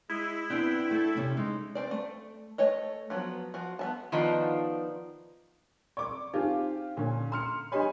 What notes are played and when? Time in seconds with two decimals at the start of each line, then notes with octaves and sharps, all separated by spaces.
0.10 G#3 E4
0.50 B3 C4 D4 G5
0.91 A3 A4
1.17 C3 C#4
1.37 G#3 D#4
1.75 C4 C5 D5
1.91 A3
2.58 A3 A4 C#5 D#5
3.10 F3 F#3 B3
3.54 F3 F#4
3.79 B3 E5 A5
4.12 D#3 F3 B3 D4 D#4 F4
5.97 D5 C#6 D6
6.34 C4 D4 D#4 F4 G4
6.97 A#2 D3 C#4
7.32 A#5 C6 F6 C#7
7.72 D4 G4 C#5 D#5 G#5 B5